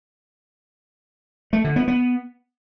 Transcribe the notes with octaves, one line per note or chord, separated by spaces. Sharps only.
A3
D3
B3
B3